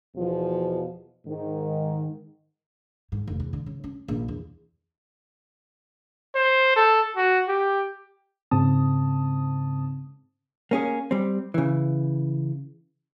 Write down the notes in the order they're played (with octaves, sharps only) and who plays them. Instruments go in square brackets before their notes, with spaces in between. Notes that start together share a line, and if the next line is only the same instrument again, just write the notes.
[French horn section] E2 B2 F3
G#2 D#3
[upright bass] G#2
F1
E2
D3
C#3
C#4
A#1
E2
[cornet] C5
A4
F#4
G4
[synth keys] G#2 C#3 C4 A5 D#6
[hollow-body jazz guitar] A#3 C#4 G#4
G3 C4
C#3 E3